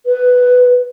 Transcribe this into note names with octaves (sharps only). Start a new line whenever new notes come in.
B4